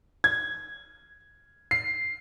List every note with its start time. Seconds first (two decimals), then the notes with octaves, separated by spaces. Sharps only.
0.24 G#6
1.71 C7